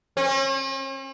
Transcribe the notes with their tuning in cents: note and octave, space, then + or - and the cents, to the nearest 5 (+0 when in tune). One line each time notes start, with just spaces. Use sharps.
C#4 -45